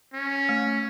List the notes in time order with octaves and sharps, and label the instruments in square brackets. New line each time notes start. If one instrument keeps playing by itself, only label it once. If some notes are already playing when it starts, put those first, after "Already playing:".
[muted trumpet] C#4
[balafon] A3